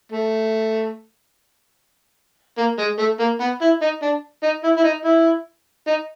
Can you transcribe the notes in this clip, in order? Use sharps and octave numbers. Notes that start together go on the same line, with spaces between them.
A3
A#3
G#3
A3
A#3
B3
E4
D#4
D4
D#4
E4
E4
D#4
E4
D#4